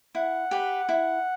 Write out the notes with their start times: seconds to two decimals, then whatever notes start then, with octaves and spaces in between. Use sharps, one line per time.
0.15 E4 F#5
0.51 G4 B4
0.89 E4